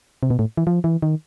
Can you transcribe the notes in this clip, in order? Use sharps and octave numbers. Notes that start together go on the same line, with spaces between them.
C3
B2
A2
E3
F3
E3
D#3